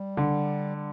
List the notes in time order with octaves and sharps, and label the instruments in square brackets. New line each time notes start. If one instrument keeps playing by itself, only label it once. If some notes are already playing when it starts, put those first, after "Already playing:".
Already playing: [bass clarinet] G3
[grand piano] D3
[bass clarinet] G3